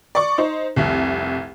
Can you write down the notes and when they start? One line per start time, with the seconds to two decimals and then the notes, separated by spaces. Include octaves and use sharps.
0.15 D5 C#6
0.38 D#4 C5
0.76 F1 C2